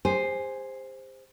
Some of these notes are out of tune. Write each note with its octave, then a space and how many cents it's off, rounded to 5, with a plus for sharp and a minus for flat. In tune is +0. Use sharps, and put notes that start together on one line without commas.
G4 +45 C5 +0 G#5 +0